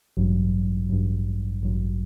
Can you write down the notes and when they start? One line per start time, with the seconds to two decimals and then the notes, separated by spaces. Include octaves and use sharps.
0.17 A1 G2 F#3
0.89 A1 G2 F#3
1.63 A1 G2 F#3